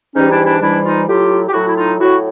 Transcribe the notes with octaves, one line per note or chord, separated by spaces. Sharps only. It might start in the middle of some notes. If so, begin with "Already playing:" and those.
G#2 E3 G3 C#4 D#4
D4 E4
D4 E4
G#2 E3 G3 D4 E4
D#4 F4
A2 F#3 F4 G4
G4
A2 F#3 E4 F#4
E4
D#4 F4
A2 F#3 E4 F#4